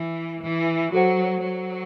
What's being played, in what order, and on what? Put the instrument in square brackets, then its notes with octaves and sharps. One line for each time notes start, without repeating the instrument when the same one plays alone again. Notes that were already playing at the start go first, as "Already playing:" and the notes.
Already playing: [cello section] E3
E3
[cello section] F#3 [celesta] F#4 A4 C5 F#5
[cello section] F#3